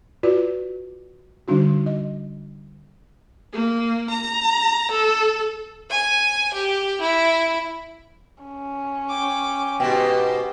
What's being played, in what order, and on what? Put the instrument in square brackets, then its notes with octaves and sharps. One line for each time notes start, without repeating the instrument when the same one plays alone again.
[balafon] F4 F#4 B4 D5
D3 G3 D4 D#4 F#4
D#5
[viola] A#3
A#5
A4
[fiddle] G#5
G4
E4
[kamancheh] C#4
[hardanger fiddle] G5 D6
[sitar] G#2 B2 [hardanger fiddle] G4 [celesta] G5